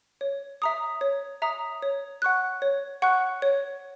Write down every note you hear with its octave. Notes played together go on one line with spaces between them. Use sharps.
C#5
E5 A#5 D#6
C#5
E5 A#5 D#6
C#5
F#5 C#6 F#6
C#5
F#5 C#6 F#6
C#5